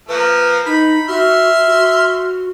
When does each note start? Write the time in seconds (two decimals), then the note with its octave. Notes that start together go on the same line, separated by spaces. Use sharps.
0.09 F3 A#3 B4
0.66 D#4 B5
1.08 F#4 E5 C6 F6
1.67 F#4